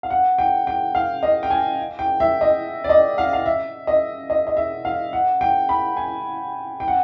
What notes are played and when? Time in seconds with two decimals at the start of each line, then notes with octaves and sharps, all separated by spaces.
0.03 F5
0.10 F#5
0.38 G5
0.67 G5
0.95 F5
1.23 D#5
1.43 G5
1.50 G#5
1.99 G5
2.20 E5
2.41 D#5
2.84 D5
2.89 D#5
3.18 F5
3.33 F5
3.46 E5
3.87 D#5
4.30 D#5
4.47 D#5
4.57 E5
4.85 F5
5.13 F#5
5.41 G5
5.69 B5
5.97 G#5
6.80 G5
6.88 F#5